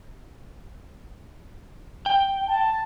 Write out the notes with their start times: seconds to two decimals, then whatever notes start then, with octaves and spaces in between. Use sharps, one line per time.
2.06 G5
2.47 A5